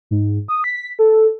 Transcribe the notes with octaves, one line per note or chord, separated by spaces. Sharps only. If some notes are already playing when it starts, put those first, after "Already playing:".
G#2
D#6
B6
A4